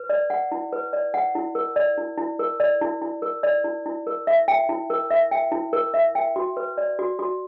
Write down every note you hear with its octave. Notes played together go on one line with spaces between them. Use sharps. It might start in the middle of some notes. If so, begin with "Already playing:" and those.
Already playing: B4
D5
F#5
E4
B4
D5
F#5
E4
A#4
D5
E4
E4
A#4
D5
E4
E4
A#4
D5
E4
E4
A#4
E5
G5
E4
A#4
E5
G5
E4
A#4
E5
G5
F#4
B4
D5
F#4
F#4